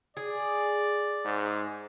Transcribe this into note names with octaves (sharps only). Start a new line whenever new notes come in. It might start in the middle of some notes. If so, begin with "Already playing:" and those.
G#4 D5
G#2